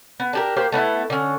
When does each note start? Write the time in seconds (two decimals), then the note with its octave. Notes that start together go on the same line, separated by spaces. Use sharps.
0.20 B3
0.33 D4 G4 A#4
0.56 A#3 G4 C5 G5
0.72 A3 B3 C#4 E4
1.10 D3 C#4